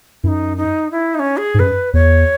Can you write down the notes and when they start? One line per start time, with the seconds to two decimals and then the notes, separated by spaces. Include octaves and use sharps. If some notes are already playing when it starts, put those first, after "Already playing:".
0.24 F#2 E4
0.28 D#4
0.57 D#4
0.91 E4
1.15 D#4
1.19 C#4
1.37 G#4
1.54 G#2
1.59 F#2 B4
1.93 E2 C#5